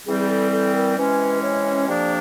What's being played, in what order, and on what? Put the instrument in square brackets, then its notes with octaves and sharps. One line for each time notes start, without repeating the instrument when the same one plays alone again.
[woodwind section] E3 G3 C4 [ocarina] G#4
[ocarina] G#4
A4
A4
A#4
[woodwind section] C3 E3 G#3 C#4 [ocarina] B4
[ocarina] C#5
[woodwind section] F2 C3 F3 A#3 D4 [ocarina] D5